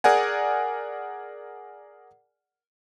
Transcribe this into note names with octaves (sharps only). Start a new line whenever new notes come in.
G#4 A#4 D5 F#5 G#5